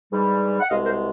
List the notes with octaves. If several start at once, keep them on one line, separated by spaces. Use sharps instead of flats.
G#2 E3 G3
F#5
C2 B2 G#3 D#5 F5
A#4 C5